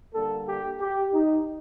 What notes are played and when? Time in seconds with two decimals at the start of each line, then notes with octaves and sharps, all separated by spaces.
0.14 D3 G3 A#3 A4
0.47 G4
0.80 G4
1.13 D#4